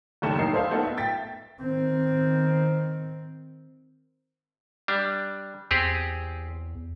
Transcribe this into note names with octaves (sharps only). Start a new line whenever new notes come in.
F#1 D#2 A3 E7
A1 D#4 A#4 C7
A4 C5 E5 F5
A3 B3 D#4 F4 A4
E5
E5 G5 A6 B6
D#3 C4
G3 D4
E2 C4 G4 G#4